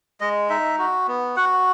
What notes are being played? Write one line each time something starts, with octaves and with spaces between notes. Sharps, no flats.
G#3 D#5
D#4 E5
F#4
B3
F#4 F#5